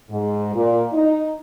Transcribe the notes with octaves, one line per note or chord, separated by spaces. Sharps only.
G#2
A#2
D#4